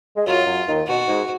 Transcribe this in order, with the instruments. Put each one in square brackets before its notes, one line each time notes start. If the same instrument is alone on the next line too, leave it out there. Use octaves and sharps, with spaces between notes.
[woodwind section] G#3
[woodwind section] F#2 F#3 [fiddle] F4
[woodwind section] F#2 F#3
D#2 D#3
[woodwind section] B2 [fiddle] F#4
[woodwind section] G#2